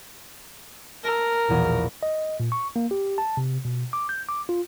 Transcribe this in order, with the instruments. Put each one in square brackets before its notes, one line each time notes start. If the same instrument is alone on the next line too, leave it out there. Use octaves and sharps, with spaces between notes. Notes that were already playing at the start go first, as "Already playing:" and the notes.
[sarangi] A#4 [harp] A5 E6
[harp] A#1 E2 B2
[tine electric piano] D#5
A#2
C#6
A#3
G4
A5
C3
B2
D6
G6
D6
F4